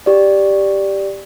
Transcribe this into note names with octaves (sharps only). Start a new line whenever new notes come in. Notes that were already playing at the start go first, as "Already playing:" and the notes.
G4 D5